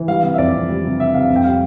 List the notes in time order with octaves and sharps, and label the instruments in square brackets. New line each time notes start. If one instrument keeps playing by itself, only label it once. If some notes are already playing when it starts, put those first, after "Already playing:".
Already playing: [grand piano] E3
G3 F5
C3 F5
E5
F2 D5
F2
G3
C3
C3 E5
C3 F5
F2
G5
G3 F5